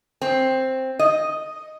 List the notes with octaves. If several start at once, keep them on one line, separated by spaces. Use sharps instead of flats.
C4
D#5